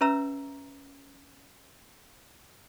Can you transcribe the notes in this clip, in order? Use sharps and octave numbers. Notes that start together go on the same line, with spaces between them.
C#4 B4 C#5 E5 A#5 E6